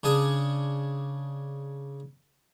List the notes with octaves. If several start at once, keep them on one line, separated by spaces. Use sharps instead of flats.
C#3 D4 G#4 G#5